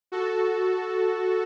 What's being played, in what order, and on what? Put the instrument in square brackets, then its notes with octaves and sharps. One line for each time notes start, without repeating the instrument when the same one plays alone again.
[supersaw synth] F#4 A4